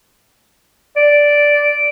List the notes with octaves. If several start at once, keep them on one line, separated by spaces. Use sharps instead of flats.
D5